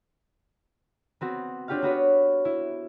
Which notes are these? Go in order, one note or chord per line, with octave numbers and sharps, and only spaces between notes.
B3 C4 F#4
C4 D4 F4 G4 C#5 F5
B3 F#4 B4 C#5
E4